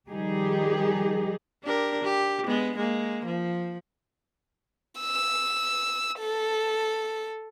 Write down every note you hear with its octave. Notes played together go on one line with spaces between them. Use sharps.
D#3 F3 G3 D#4 G4 G#4
D4 G4 A#4
G4
G#3 B3
G#3 A#3
F3
E6
A4